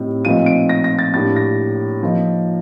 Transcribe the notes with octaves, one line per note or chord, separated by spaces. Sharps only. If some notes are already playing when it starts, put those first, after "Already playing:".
Already playing: A2 G3 C4 D#4
A#2 F3 A3 C4 D#4 D#7
D7
A#6
A#6
A6
A2 G3 A#3 D4 A6
A#6
F3 A#3 D#4